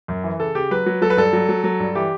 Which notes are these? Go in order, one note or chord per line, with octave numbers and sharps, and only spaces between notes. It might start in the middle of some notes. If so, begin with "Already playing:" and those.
F#2
E3
C#3 A4
C#3 G4
F#3 B4
F#3
F#3 A4
B4
G2 A4
F#3
F#3
F#3
G2
E3 G4